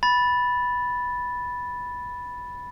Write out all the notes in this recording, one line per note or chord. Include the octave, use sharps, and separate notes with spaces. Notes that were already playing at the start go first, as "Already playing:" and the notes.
B5 A6